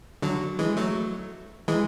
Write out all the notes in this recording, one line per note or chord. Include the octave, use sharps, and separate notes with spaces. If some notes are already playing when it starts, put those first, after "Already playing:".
D3 F#3
E3 G#3
F#3 A3
E3 G#3